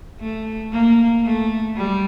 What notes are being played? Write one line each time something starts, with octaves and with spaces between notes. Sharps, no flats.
A3
A#3
A3
G3